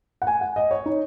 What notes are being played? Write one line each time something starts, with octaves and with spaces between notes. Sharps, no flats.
F#5
G#5
F#5
D#5
C#5
D#4